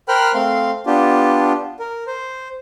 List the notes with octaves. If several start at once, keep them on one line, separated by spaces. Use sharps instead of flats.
A#4 C5 G5 B5 F6 F#6
A3 C4 F5 C6
B3 D4 F4 G4
A#4
C5